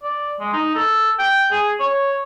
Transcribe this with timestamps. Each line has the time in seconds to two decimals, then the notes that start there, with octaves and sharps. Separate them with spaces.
0.03 D5
0.40 G#3
0.53 D#4
0.75 A4
1.19 G5
1.51 G#4
1.80 C#5